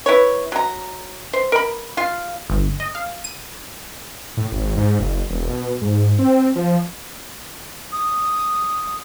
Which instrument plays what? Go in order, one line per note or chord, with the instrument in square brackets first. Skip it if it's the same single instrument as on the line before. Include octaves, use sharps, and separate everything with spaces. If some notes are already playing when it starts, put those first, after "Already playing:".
[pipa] E4 B4 C#5
F#3 A#5
C5
A#4 B5
F4 F5
[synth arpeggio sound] G1
D#5
F5
D#7
[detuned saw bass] A2
G#1
G#2
F#1
E1
B2
G#2
C4
F3
[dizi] D#6